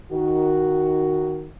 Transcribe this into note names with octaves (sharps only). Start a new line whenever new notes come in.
D#3 F#4